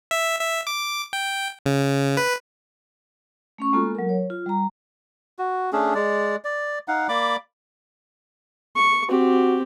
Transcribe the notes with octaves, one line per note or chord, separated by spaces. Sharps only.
E5
E5
D6
G5
C#3
B4
A3 C#4 C#6
G#3 A#3 B3 F4 F#4 A4
F#3 A#4
C#5
F4
G3 A#5
F#4
A3 C#4 D4 G#4
G#3 D5
D5
D#4 F5 F#5
A#3 D5 B5 D6
C#6
C4 F#4 G4